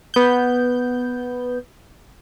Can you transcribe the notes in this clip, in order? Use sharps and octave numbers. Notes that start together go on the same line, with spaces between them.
B3 G6